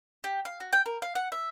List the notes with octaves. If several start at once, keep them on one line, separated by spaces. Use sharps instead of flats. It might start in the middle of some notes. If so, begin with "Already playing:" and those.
G4
F5
F#4
G5
A#4
F5
F#5
E5